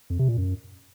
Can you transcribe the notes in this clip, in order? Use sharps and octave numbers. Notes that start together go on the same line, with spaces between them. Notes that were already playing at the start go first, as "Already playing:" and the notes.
F2
C3
A#2
F#2